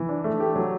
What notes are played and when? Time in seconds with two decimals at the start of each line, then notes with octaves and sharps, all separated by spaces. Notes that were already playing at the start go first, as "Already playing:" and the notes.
Already playing: E3
0.09 D4
0.24 A3
0.40 G4
0.55 F#3